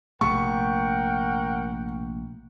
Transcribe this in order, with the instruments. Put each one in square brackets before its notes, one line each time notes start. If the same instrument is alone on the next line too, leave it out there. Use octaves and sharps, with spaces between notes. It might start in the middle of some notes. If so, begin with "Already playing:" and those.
[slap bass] A#1 C3 A3 [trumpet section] A#4 F#5 G5 [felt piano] C#6